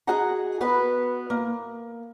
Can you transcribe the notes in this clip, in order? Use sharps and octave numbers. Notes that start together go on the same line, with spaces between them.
F#4 G#4 D#5 F#5 A#5
B3 F#4 B4
A#3